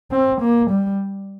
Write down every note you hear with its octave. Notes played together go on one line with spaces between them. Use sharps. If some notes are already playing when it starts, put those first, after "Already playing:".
C4
A#3
G3